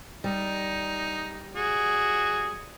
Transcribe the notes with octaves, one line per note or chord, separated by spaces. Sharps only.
G3 D#4
F#4 G#4